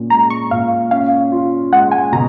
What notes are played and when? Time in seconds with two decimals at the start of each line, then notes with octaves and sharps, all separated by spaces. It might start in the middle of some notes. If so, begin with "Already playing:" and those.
Already playing: A#2 C#4
0.10 G#3 A#5
0.30 C#6
0.51 A#2 F5
0.91 C#4 F5
1.32 F4
1.73 G#3 F#5
1.92 G#5
2.12 B2 A#5